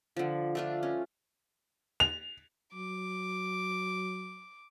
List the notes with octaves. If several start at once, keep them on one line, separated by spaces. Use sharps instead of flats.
D3 F3
A3 D4 F4
C#4
F7
F#3 D6